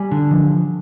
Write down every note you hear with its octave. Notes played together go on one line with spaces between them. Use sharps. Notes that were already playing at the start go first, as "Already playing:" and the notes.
Already playing: G3 G#5
D3
F3